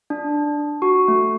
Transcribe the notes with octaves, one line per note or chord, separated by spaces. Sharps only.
D4
F#4
A3